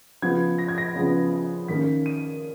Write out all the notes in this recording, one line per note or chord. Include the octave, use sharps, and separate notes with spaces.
C#3 F3 B3 G#6
A#6
G#6
A#6
C#3 F3 B3
D#3 A#3 C#4 B6
D#7